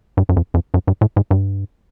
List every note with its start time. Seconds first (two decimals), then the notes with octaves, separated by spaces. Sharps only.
0.17 G2
0.29 F#2
0.36 F2
0.54 F2
0.74 F#2
0.87 G2
1.01 A2
1.16 G#2
1.31 G2